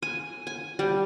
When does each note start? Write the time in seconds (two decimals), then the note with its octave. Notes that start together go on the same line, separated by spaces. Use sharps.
0.02 G#5
0.47 G#5
0.79 G3